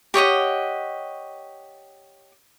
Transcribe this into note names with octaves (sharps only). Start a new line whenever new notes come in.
G4 C#5 D#5 F#5